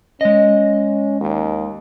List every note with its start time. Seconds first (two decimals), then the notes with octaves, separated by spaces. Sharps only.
0.21 G#3 C#4 D#5
1.21 D#2